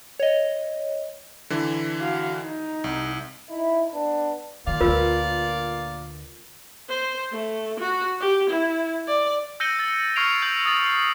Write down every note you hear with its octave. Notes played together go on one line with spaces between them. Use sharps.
C#5 D#5
D3 E3
F#4 F5
D#4
C2
D#4 E4
B3 D4
A#2 D#3 D5 F5
D2 D3 F4 A#4 B4
C5
A3
F#4
G4
E4
D5
E6 G6 A#6 C#7 D#7 G7
E6 A6
C#6 F6 G#6 C7 D7 F7
E6 G6 F#7
D#6 A6 C#7
C7